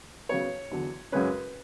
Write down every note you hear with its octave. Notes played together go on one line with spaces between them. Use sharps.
C#3 F#3 B3 C#5
E2 D3 F#3
F#2 C#3 G#3 C#4 B4